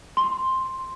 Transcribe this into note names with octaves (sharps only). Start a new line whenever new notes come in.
C6